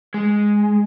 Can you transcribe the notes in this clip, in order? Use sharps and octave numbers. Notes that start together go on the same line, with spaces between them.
G#3